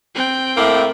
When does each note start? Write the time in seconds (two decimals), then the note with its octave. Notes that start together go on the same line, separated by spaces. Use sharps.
0.15 C4 G5
0.57 A2 A3 A#3